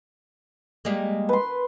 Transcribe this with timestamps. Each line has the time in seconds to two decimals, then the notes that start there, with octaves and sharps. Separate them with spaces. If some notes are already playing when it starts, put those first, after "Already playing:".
0.85 G3 G#3 A#3
1.29 B4 C6